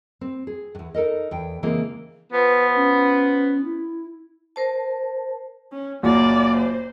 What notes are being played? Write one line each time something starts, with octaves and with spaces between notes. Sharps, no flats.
C4
G#4
E2 G2
D#4 A4 A#4 D#5
E2 G5
C#3 E3 G#3 A#3 C4
F3 B3 B4
C#4
E4
A#4 C5 A5
C#4
F#1 A#2 A#3 F#4 D5
C5